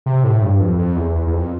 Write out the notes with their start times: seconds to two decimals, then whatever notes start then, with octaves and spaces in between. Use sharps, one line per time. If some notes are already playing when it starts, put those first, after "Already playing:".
0.06 C3
0.24 A2
0.42 G2
0.60 F2
0.78 F2
0.96 E2
1.15 E2
1.27 E2
1.33 F2